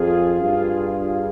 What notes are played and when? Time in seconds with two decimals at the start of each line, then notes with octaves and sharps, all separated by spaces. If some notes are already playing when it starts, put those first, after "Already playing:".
Already playing: F2 F4 G#4
0.42 G2 F4 G#4